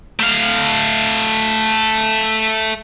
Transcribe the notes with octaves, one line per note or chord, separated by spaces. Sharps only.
A3 F5